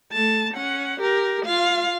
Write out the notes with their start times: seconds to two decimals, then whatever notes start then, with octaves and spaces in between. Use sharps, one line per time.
0.13 A3 A5
0.53 C#4 F#5
1.00 G4 A#4
1.45 F4 F5